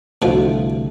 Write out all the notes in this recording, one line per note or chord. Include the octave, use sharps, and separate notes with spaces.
C2 B2 D3 F3 A3